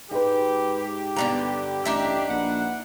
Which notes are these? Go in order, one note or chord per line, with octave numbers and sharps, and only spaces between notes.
G#2 G#3 G4 B4
G2 D3 B3 A#5
A1 D4 D#4 E5
A#1 B4 F#5